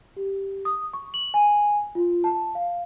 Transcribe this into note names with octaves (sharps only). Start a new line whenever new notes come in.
G4
D#6
C#6
F#7
G#5
F4
A5
F5